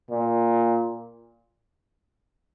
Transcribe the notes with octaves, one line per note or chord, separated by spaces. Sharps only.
A#2